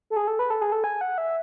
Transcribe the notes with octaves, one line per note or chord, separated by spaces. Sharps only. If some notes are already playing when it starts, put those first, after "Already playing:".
A4
G#4
A4
B4
A4
G#4
A4
G#5
F#5
E5